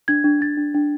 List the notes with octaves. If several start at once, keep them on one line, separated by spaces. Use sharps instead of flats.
D4 G#6
D4
D4 A6
D4
D4